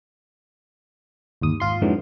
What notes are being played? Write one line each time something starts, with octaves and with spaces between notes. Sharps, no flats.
G1 D#2 D#6
G#1 F4 C6
F2 G#2 D3 E3 F#3